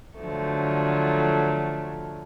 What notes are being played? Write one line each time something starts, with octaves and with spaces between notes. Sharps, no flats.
D3 F3 F#3 A3